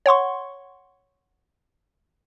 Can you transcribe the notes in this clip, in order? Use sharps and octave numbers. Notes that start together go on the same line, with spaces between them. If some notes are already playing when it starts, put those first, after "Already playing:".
C#5 F#5 C6 C#6